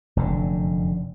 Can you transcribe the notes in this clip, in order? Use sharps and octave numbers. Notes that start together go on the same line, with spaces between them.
F1 F#2 D3